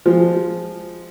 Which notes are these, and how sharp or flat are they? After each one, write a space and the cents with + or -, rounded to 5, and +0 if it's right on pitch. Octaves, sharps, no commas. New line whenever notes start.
F3 -5 G#3 -15